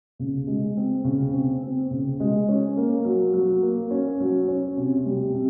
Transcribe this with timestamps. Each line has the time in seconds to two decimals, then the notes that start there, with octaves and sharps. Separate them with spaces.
0.19 C#3
0.47 G#3
0.77 C4
1.04 C#3
1.33 C4
1.63 C4
1.91 C#3
2.20 G#3
2.49 C#4
2.77 A#3
3.05 F#3
3.34 F#3
3.62 A#3
3.91 C#4
4.20 F#3
4.48 C#4
4.77 C3
5.06 G3
5.34 C3